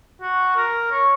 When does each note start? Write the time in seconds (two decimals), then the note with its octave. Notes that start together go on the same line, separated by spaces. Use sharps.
0.22 F#4
0.56 A#4
0.92 C#5